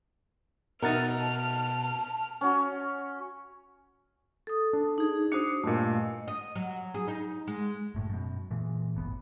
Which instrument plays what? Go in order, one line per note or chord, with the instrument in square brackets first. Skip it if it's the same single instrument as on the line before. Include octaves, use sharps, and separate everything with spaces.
[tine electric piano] B2 F#5 A6 [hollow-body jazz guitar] D#4 A#4 [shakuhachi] E5 [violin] F6
[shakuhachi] A5
[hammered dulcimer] C#4 F#4
[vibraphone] A4 D#6
[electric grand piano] D4
[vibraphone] D#4 G#4
[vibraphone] D4 F#4 C5 [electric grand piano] D#6 C#7
[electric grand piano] G2 A#2 [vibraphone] A3 D#5
[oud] D#5
F#3
G#4
D#4
G#3
[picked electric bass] F#1 A2
F#2 B2
A#2 E3 G#3
D1 G1 C2 B3